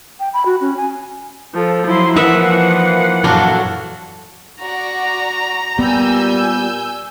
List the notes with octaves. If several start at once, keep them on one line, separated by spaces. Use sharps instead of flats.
G5
B5
F#4
C#4
G#5
F3 A4
F3 F#3 E4 C6
E3 F3 A#3 D#4 A#4 B4 E5 F#5
F#2 A#2 E3 F#3 D4 F4 F#4 A4
F#4 D5 A#5
A#2 G3 B3 G#5 E6 G6